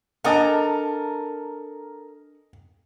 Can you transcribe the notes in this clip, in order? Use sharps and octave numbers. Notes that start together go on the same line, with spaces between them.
D4 A4 A#4 D#5 F#5 G#5